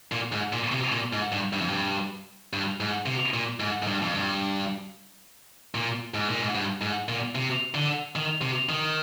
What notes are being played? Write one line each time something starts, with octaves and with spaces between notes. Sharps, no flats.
A#2
G#2
A#2
C3
A#2
G#2
G2
G2
F2
G2
G2
G#2
C3
A#2
G#2
G#2
G2
F2
G2
A#2
G#2
A#2
G#2
G2
G#2
A#2
C3
D3
D#3
C3
D#3